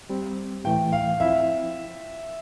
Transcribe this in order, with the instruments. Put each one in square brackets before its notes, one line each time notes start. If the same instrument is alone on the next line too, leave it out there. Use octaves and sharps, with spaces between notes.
[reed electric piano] G3 C4 G4
[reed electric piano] A2 E3 A3 [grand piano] G5
[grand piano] F5
[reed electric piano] F3 C4 E4 [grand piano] E5